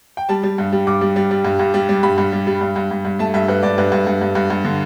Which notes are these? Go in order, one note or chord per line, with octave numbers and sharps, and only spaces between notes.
G5
G3 A5
G3
G2
G3
G2 D6
G3
G3
G3
G2
G2
G3
G3
G2 B5
G2
G3
G3
G2
G2
G2
G2
A3 A5
G2 E5
G2 B4
G2 D5
G2 B4
G2
G2
G2
G2
G2
D3